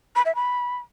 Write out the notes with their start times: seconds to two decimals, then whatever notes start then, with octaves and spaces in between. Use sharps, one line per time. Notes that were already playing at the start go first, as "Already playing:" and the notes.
0.16 B5
0.25 E5
0.35 B5